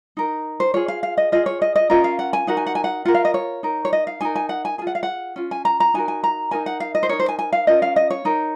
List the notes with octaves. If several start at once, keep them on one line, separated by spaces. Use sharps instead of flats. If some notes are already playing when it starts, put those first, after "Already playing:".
D#4 A#4
C5
F4 G#4 C#5
F5
F5
D#5
F4 G#4 D#5
C#5
D#5
D#5
C#4 F4 A#4 D#5
F5
F#5
G#5
D#4 F#4 A#4 F#5
G#5
F#5
G#5
F#5
F4 A#4 F#5
F5
D#5
C#5
D#4 A#4
C#5
D#5
F5
D#4 A#4 G#5
G#5
F#5
G#5
F4 G#4 G#5
F#5
F5
F#5
C#4 F4
G#5
A#5
A#5
D#4 F#4 A#4 G#5
G#5
A#5
D#4 F#4 A#4 G#5
F#5
F5
D#5
C5
D#4 A#4 C#5
C5
G#5
G#5
F5
C#4 F4 A#4 D#5
F5
D#5
C#5
D#4 A#4